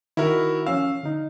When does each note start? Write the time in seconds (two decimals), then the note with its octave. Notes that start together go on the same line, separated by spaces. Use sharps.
0.17 D#3 E4 F#4 A#4
0.66 F3 C#4 F5 E6
1.03 D3 D#4